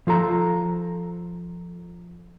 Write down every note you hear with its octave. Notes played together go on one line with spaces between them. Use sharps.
F3 F4 A4 A#5